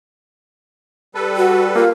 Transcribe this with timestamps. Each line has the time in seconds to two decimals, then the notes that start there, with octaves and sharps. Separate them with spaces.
1.15 G3 A4 B4
1.37 F#4
1.76 A#3 F4